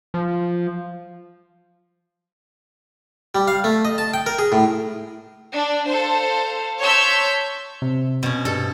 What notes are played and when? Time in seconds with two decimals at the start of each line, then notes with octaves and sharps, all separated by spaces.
0.14 F3
3.35 G3
3.48 F5
3.64 A3
3.85 D#5
3.98 A5
4.14 G5
4.26 A#4
4.39 G#4
4.52 A2
5.55 D4
5.87 A4 C5 F5
6.81 C#5 A5 C6 E6 G6 B6
7.82 C3
8.23 B2 C#4
8.45 G2 A4